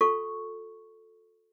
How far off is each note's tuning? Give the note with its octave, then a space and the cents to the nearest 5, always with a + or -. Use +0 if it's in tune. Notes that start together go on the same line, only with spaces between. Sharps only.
F4 +45 A4 +0 C#6 +0